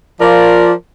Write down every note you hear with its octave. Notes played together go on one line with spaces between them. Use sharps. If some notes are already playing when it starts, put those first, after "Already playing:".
F3 F4 A#4 D5